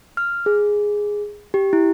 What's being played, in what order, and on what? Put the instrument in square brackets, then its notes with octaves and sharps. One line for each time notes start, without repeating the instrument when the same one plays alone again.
[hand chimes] F6
G#4
G4
E4